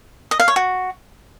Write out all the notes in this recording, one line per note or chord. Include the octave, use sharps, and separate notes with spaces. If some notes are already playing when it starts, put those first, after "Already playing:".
D#5
F5
C#5
F#4